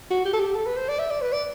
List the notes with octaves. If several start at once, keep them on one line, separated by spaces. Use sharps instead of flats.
F#4
G4
A4
G4
A4
B4
C5
D5
E5
D5
B4
D5